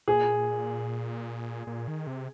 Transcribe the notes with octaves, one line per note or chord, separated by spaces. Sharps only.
A#2 G#4
A#2
D#3
C3